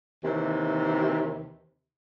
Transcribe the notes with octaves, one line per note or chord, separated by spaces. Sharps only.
D#2 C3 E3